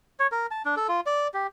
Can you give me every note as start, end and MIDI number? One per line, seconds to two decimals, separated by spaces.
0.20 0.27 73
0.32 0.46 70
0.51 0.62 81
0.65 0.75 62
0.77 0.87 69
0.89 1.00 65
1.06 1.28 74
1.34 1.47 67